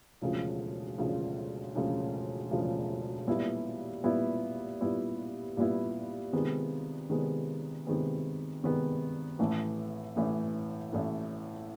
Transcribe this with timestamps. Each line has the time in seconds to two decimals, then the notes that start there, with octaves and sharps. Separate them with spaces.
0.21 E1 D2 C#3 F3
0.98 E1 D2 C#3 F3
1.75 E1 D2 C#3 F3
2.51 E1 D2 C#3 F3
3.27 A#2 G3 B3 E4
4.04 A#2 G3 B3 E4
4.81 A#2 G3 B3 E4
5.57 A#2 G3 B3 E4
6.33 C3 D#3 G#3 B3
7.10 C3 D#3 G#3 B3
7.87 C3 D#3 G#3 B3
8.63 C3 D#3 G#3 B3
9.39 A1 A2 E3 A3
10.16 A1 A2 E3 A3
10.93 A1 A2 E3 A3